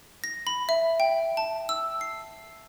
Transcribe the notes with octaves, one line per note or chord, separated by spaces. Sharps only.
A#6
B5
E5
G5
A5
E6
C7